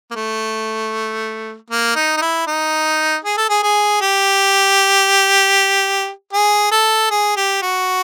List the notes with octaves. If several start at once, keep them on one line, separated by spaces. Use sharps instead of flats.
A#3
A3
A#3
D#4
D#4
E4
D#4
G#4
A4
G#4
G#4
G4
G#4
A4
G#4
G4
F#4